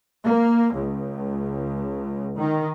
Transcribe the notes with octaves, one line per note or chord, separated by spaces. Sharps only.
A#3
C#2
D#3